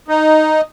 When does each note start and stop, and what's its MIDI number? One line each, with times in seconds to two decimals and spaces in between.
0.08 0.61 63